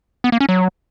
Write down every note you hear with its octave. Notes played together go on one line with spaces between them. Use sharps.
B3
A#3
C#4
F#3